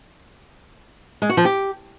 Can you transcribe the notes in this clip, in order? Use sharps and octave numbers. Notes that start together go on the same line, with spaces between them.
G#3
F#4
F3
G4